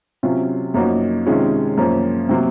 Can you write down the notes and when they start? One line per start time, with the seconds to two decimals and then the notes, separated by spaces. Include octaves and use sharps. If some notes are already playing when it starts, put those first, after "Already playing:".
0.23 C3 F#3 C#4 F4
0.74 F#2 F3 A#3 D#4 F#4
1.26 C3 D#3 G#3 C#4 F4
1.77 F#2 F3 A#3
2.29 C3 F#3 A#3